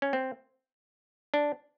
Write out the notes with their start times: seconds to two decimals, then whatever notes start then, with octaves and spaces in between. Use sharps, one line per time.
0.02 C#4
0.13 C4
1.34 D4